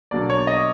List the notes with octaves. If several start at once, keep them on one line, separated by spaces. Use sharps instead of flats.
B2 F#3 A#3 D4 D5
C#5
D#5